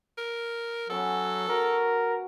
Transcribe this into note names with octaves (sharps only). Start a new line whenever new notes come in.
A#4
F#3 B3 C#4 A4 B4
F#4 A#4